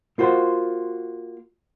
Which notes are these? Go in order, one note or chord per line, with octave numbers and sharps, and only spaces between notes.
A#3 F4 F#4 C5